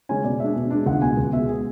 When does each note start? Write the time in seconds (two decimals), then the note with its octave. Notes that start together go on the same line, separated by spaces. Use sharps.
0.09 C#3 G#3 C#4 G#5
0.24 B2 D5
0.40 G#3 D4 E5
0.56 B2
0.71 G#3 D4
0.86 C#2 F#5
1.02 B2 G#3 G#5
1.17 C#2
1.33 B2 G#3 E5
1.49 G#4